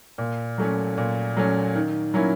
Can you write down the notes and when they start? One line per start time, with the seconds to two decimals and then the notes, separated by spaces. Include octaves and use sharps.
0.18 A#2
0.58 F#3 A3 C#4
0.98 A#2
1.37 F#3 A3 C#4
1.75 D#3
2.14 F#3 A#3 C#4 E4